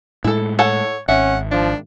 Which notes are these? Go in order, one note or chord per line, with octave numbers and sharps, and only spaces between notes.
A2 G#3 E4 A4
A4 C#5 F#5 A5
G#1 C#4 E5 F#5
F3 D4